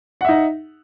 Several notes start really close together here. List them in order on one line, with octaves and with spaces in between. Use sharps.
F#5 E5 D#4